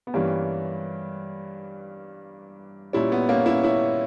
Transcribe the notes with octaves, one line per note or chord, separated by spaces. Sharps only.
B3
G2 E3 G3 A#3 C#4
A#2 G3 C#4 E4
B3
A#3 C#4
C#4 E4
C#4 E4